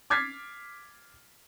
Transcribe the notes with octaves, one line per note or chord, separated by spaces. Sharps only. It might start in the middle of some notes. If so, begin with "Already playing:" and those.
D6 F6 G#6 A6 B6 C7